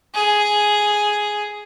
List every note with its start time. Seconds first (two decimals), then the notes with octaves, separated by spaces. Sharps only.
0.14 G#4